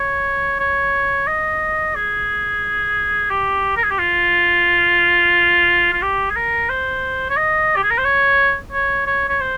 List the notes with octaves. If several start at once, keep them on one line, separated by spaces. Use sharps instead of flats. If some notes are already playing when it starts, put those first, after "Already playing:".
Already playing: C#5
C#5
D#5
G#4
G4
A#4
G#4
G4
F4
F4
G4
G#4
A#4
C5
C#5
D#5
G4
G#4
A#4
C5
C#5
C#5
C#5
C#5
C5